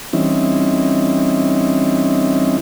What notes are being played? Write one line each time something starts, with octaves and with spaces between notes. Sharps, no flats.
E3 G3 C4 C#4 D#4 E4